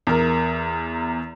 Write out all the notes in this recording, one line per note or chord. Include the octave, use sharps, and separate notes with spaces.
E2 A#4